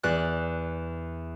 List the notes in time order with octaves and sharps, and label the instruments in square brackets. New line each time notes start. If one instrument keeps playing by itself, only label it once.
[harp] E2 D5 F#6